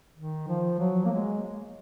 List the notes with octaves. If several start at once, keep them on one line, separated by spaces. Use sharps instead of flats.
D#3
F3
F#3
A#3
G#3